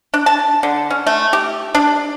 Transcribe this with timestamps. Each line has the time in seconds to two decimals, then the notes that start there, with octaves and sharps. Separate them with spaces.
0.14 D4
0.26 A5
0.63 D3
0.90 C#4
1.07 A3
1.33 G4
1.75 D4